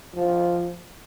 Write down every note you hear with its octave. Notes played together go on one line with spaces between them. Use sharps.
F3